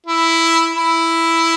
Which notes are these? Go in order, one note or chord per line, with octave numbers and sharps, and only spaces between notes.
E4
E4